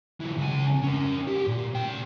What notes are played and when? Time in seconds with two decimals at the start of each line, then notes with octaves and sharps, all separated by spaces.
0.20 E3 F#3
0.37 C#2 G#5
0.83 C#4 A#4
1.28 F#4 G4
1.47 A#2
1.74 C#3 G5